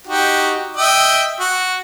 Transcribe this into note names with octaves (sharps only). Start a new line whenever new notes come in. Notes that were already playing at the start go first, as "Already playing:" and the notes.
D#4 F#4 G4
D#5 E5 G5
F#4